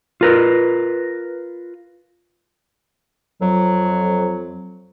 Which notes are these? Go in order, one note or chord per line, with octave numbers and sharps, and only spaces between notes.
F4 A#4 B4
F2 F#3